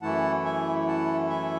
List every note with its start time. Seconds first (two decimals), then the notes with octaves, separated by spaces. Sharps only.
0.02 F#2 E3 A3 E4 F#5 A5
0.44 E5 G#5
0.88 F#5 A5
1.30 E5 G#5